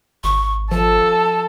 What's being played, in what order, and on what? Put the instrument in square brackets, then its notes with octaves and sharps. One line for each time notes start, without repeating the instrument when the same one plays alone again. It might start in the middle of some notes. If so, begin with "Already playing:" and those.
[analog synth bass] G#1 [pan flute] C#6
[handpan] F3 [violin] A4 [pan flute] A5